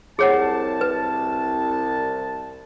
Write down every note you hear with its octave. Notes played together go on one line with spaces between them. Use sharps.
C2 G#4 C#5 F#5 A5
B4